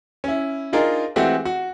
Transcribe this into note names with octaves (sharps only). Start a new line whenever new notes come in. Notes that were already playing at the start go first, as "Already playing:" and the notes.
C#4 E4
D4 D#4 F4 G#4 A#4
E3 G#3 A3 C4 F#4 G4
F#4